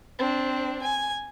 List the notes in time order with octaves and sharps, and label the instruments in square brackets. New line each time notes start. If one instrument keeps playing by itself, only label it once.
[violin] C4 D4
G#5